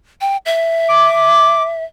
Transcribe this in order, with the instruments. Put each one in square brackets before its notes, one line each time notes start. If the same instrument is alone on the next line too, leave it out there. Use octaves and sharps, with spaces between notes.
[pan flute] G5
E5
[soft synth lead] D6